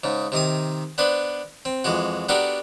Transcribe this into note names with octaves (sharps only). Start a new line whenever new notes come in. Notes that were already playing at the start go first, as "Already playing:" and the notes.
G#2 C#3
C3 D#3 D#4 D#6
B3 D4 B4 C5
C4
F2 E3 G#3 F#4
B3 D4 F#4 G4 A4 A#4